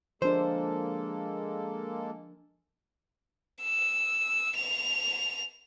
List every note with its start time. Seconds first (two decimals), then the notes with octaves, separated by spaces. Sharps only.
0.22 F3 G#3 A#3 D4 A4 C5
3.62 E6
4.56 F7